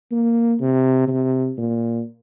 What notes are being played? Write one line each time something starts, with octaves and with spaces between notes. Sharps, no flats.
A#3
C3
C3
A#2